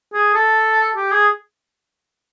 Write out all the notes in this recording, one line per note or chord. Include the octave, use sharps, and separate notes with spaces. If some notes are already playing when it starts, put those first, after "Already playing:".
G#4
A4
G4
G#4